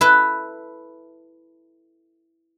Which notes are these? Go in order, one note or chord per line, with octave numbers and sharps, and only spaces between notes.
E4 A4 B4